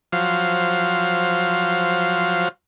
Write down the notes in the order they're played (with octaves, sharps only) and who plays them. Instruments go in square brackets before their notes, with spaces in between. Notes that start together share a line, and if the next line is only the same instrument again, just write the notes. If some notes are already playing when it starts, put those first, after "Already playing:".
[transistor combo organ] F3 F#3 C5 F5